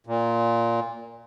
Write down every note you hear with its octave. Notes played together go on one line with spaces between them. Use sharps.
A#2